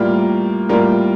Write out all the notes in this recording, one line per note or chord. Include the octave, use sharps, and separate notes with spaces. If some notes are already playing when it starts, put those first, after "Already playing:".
Already playing: A2 G3 A#3 F4 A#4
A2 G3 A#3 F4 A#4